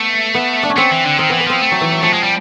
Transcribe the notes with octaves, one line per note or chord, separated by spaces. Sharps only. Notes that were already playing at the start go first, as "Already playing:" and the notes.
Already playing: A3 B3
B3
D4
C#4
A3 C4
E3
D3
D#3 C4
E3 B3
B3
F3 C4
A3
F#3
E3
F#3
F3 A3
G#3
G3